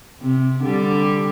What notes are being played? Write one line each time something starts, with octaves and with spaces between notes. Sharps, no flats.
C3
D3 G3 G4